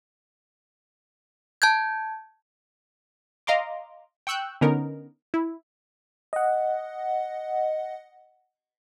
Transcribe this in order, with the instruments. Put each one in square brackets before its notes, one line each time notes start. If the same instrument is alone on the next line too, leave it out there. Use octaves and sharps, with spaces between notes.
[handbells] A5 G6 G#6
[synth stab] D#5 F5 A#5 C6 D6
G5 C#6 E6 F#6 G6
D3 B3 C#4 D#4 A#4
E4
[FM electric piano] D#5 F#5